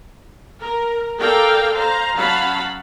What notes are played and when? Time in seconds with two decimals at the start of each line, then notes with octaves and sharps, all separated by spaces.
0.61 A#4
1.19 A4 A#4 D5 F5 G5
1.75 C5 F5 A#5
2.15 F#3 C#4 F5 F#5 A5 B5